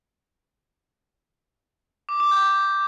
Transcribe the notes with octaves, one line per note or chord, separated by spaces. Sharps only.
D6
D6
G6